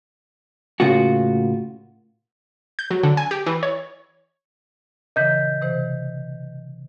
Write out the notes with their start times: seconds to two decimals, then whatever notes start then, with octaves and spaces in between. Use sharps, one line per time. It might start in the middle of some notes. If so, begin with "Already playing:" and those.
0.80 A2 C#3 A#3 F4 F#4
2.79 G6
2.91 F#3
3.03 D3
3.17 G#5
3.31 G4
3.47 E3
3.63 C#5
5.16 A#2 C#3 E3 D#5 G6 B6
5.62 C3 E3 C5